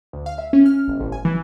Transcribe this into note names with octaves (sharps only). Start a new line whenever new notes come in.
D2
F5
E5
C#4
F6
G1
A1
G#5
E3